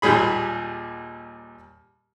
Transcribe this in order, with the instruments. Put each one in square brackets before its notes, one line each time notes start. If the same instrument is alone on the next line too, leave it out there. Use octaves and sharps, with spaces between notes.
[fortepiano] D#2 A#2 G3 G#4 B5